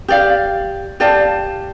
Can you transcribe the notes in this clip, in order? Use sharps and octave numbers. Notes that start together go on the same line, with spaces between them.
G4 D5 F5
G4 D5 F5 A5